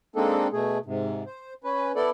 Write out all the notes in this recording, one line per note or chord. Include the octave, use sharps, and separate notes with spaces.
G#3 A#3 C4 D4 D#4 A4
B2 A3 G#4
G#2 C3
C5
C#4 B4
B3 E4 A4 D5